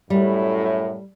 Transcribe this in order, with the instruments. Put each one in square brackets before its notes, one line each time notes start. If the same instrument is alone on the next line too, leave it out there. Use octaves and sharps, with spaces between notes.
[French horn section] F#2 A2 [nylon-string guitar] G3